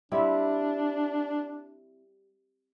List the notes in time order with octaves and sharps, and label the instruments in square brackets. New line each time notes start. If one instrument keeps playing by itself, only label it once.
[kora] G3 C4 E4 [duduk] D4